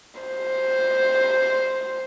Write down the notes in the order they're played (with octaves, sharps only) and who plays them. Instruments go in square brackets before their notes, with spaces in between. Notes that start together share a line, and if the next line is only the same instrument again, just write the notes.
[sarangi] C5